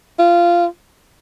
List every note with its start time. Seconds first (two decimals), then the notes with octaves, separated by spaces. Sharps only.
0.19 F4